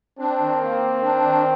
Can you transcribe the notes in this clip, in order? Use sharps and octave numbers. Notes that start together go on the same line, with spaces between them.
C4 D4
D#3
A#3
D#3
D4
D#3